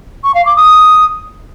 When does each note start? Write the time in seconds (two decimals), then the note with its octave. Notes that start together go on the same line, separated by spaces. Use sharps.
0.24 C#6
0.35 F5
0.46 D6
0.57 D#6